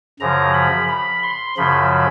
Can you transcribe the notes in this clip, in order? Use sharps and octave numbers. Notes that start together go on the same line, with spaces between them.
F#2 C#3 F3 A#5
B5
B5
C6
F#2 C#3 F3 B5